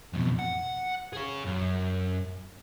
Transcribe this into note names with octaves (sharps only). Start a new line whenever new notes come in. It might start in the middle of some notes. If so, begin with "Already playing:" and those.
F2 B2
F#5
G#4 C#5
F#2